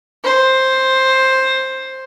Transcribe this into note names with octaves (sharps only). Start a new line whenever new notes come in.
C5